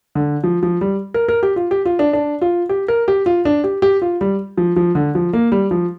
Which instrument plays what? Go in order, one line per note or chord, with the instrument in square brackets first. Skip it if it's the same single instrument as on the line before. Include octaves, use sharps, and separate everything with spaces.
[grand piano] D3
F3
F3
G3
A#4
A#4
G4
F4
G4
F4
D4
D4
F4
G4
A#4
G4
F4
D4
G4
G4
F4
G3
F3
F3
D3
F3
A#3
G3
F3